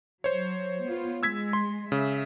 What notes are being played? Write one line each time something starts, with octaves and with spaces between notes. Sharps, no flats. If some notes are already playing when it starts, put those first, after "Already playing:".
F#3 C5 C#5
B3 F4
G#3 E6 G#6 B6
C6
C#3 E5